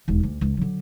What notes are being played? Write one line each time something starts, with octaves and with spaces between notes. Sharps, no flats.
E1 D#2
D2
C#2
D3 F#3